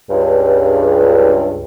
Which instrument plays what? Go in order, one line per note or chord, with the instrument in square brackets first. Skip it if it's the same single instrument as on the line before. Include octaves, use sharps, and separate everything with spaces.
[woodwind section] C#2 G2